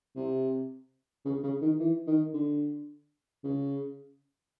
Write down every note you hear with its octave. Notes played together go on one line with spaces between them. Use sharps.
C3
C#3
C#3
D#3
E3
D#3
D3
C#3